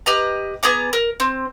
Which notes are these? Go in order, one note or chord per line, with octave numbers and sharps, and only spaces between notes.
G4 B4 D#5 A#5
B3 G#4 A#5 D6
A#4
C4